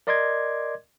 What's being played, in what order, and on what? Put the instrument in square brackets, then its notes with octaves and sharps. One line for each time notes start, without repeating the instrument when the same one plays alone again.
[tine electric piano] A#4 D5 D#5 C6 D6 G#6